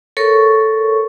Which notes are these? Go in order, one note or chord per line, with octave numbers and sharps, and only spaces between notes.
A4 A#4 C#5 C#6